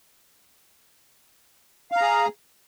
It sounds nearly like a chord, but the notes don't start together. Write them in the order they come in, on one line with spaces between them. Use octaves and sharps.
F5 A#5 G#4